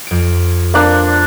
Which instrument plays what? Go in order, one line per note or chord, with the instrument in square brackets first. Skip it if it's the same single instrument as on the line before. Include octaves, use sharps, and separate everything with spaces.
[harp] F2 D7
[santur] A#3 D4 [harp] C4